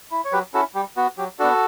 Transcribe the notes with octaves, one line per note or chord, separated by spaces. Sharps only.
E4
C#5
F#3 G4 B4
C#4 E4 F#4 A4
G3 G4
B3 F#4
F#3 G4
B3 D4 F#4 A4